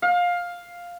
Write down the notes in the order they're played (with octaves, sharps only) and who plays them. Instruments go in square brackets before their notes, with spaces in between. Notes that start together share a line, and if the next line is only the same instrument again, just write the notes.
[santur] F5